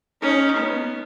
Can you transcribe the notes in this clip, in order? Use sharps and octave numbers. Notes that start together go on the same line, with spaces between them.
C#4 D#4
B3